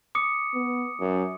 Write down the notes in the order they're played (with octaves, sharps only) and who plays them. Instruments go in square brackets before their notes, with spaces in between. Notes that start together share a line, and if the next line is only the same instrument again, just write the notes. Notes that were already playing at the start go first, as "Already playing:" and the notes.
[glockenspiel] D6 D#6 C#7
[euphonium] B3
F#2